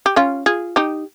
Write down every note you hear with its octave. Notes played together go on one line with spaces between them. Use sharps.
G4
C#4 F4
F4 G#4
D#4 G4